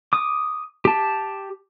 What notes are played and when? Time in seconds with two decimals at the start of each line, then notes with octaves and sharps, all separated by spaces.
0.13 D6 D#6
0.85 G4 A5